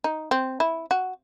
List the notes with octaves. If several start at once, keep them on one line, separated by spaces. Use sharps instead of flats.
D#4
C4
E4
F#4